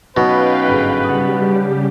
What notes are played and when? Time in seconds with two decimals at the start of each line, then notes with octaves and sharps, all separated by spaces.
0.17 B2 F#3 C#4 D#4 B4 F5 G5
0.68 G1 G#2
1.04 C#3 G3 G4 F#5 A5 D#6